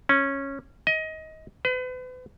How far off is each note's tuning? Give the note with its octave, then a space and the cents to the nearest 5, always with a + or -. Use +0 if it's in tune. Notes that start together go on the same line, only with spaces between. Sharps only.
C#4 -10
D#5 +20
B4 +40